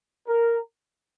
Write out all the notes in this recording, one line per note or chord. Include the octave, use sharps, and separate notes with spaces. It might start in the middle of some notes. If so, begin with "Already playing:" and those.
A#4